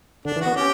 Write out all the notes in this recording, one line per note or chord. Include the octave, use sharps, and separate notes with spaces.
D3 D4
E3
B3 F#4
C#4 G4